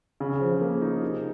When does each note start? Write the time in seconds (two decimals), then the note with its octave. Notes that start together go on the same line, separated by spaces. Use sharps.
0.20 C#3
0.41 F3
0.61 A#3
0.82 D#4
1.02 C3